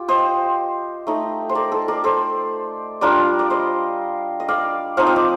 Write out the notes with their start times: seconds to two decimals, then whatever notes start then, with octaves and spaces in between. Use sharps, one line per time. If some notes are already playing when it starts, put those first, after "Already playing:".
Already playing: F4 G4
0.08 C5 D#5
1.07 A3 D#4
1.49 C5
1.55 A#4 D5
1.72 A4 C5
1.88 A#4 D5
2.04 A4 C5
3.01 G3 D4 F4 A#4 D5
3.39 D5
3.50 C5 D#5
4.40 D#5
4.48 D5 F5
4.97 F3 C4 D#4 F5
5.07 D#5
5.16 D5